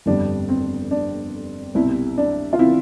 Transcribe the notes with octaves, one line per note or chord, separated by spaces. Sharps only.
G1 F2 D3 G3 D4
C4
D4
C2 B2 G3 C4 E4
D4
F4
C4 E4